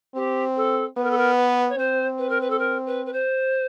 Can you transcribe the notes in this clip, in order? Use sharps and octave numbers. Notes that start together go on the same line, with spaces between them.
C4 G4
A4
B3 B4
A#4
A4
A#4
B4
C#5
C4 C5
B4
A#4
B4
A4
A#4
B4
B4
C5